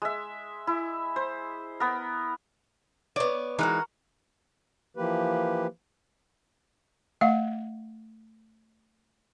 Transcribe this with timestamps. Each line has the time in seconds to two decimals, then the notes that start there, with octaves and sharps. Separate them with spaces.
0.02 G#3 E5
0.67 E4
1.16 C5
1.80 B3 A#4
3.16 B3 C#5 D5
3.59 E3 G#3 D#4 F#4 G4 A#4
4.96 E3 F3 A#3 G4 B4
7.21 A3 F5 F#5